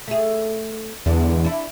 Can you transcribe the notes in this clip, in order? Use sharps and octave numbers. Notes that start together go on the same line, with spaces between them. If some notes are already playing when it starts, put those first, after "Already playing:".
A3 G#4
E2 D3 G#3 D4
D4 E4